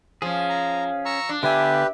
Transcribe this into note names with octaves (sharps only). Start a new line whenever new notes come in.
F3 C#4 G#4
A#5
A#5 C#6 E6
D4
D3 B3 G4 B4 E5 G#5